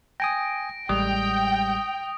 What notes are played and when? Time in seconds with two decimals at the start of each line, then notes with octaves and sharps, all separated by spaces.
0.20 G5 G#5 D#6 A#6 D7
0.89 A1 G3 G#3 G5 D#6